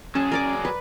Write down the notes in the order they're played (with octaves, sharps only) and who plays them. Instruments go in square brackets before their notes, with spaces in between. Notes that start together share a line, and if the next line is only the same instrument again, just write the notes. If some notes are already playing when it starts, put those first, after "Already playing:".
[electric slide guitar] F#3 G#4 [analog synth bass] C#4 [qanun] A5
[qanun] A#4 D5 D6
B4